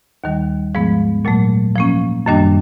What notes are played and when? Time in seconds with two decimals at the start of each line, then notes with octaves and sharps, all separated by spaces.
0.24 D#2 D#3 G3
0.75 G#2 F3 G#3 B3
1.25 A#2 F#3 A3
1.76 F3 A#3 C#4
2.26 F#2 D#3 G3 A#3 D4